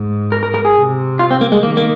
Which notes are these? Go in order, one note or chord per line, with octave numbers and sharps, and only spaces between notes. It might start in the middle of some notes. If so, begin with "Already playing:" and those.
Already playing: G#2
A#4
A#4
A#4
G#4
C3
F4
C4
A#3
G#3
D#3 A#3
A#3